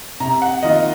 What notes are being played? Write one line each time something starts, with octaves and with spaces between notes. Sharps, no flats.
C3 A#5
F#5
D#3 A#3 F4 D#5